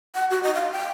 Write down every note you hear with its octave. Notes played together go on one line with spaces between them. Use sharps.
F#5
F#4
D#5
F5
G5